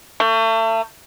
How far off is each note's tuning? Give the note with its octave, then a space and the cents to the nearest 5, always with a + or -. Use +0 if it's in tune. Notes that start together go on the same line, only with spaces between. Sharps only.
A3 +35